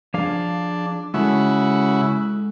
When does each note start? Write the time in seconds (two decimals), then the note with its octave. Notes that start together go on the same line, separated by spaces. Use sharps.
0.14 F3 D4 G#4 F5
1.14 C#3 G#3 E4 F#4 A4